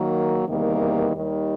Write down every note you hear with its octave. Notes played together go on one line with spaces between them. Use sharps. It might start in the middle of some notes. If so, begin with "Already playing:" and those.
Already playing: D#3 F#3 A#3
E2 C3 D#3 G3 A#3
D#2 D#3 G3